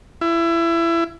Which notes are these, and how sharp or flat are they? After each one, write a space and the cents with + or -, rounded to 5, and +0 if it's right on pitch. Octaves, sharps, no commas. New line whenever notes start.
E4 +25